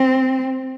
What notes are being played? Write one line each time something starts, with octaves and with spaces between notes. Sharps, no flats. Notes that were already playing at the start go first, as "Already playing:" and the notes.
Already playing: C4